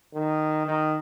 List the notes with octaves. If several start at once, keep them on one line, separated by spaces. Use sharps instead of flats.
D#3
D#3